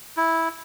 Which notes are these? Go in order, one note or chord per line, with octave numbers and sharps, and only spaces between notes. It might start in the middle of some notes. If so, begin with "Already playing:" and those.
E4